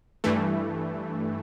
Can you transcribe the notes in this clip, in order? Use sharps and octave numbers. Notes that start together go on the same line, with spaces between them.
G2 E3 A3